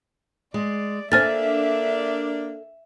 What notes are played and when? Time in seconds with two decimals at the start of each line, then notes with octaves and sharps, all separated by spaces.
0.54 G#3 D5
1.12 A#3 D4 A4 C5 E5 G#5 F6 A6